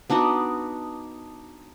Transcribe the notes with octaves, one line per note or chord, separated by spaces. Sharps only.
B3 D4 D#4 F#4